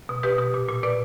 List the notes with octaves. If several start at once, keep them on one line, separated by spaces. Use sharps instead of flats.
B2
B2 G4 B4
B2
A#2
A#2
A#2 B4 D5